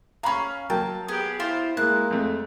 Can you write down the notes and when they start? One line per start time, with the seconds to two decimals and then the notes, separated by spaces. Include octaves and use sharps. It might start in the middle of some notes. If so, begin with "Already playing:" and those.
0.23 C#4 F5 A#5 B5 C#6
0.70 F#3 A#3 G5 A5
1.08 B3 G4 G#4
1.40 E4 F4 G4 C5
1.77 G#3 A#3 E4 F#6
2.11 F2 A3